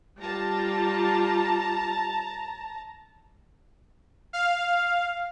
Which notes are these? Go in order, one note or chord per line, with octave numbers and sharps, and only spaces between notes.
G3 F4 A5 A#5
F5